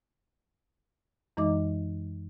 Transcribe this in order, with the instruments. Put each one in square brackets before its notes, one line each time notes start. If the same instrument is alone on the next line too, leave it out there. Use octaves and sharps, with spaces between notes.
[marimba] F#2 E3 G#3 D#4 D#5 D6